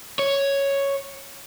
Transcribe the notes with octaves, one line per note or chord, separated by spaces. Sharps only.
C#5